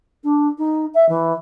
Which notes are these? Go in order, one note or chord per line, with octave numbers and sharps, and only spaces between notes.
D4
D#4
E5
E3